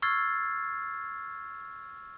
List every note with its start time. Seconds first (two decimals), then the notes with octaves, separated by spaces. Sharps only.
0.02 C#6 E6 F6 G#6 A6 C7